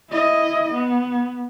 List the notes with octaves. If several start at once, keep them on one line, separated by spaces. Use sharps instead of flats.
E4 D#5
B3